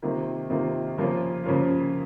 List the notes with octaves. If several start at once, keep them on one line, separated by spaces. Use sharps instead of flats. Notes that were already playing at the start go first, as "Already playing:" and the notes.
C3 D#3 A#3 F4
C3 D#3 A#3 F4
C#3 F3 A#3 C#4 F4
C#3 F3 A#3 C#4 F4